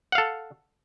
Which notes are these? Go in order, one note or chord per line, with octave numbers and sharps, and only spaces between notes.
A4 F5 F#5